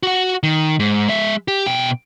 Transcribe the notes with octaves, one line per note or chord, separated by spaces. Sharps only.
F#4 F#5
D#3
G#2
G#3 E5
G4
B2 G5